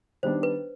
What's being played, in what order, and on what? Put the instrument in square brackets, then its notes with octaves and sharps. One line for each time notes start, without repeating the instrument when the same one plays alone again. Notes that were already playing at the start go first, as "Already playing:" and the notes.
[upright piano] D#3 G3 B3 D4 [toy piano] C5
[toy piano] B4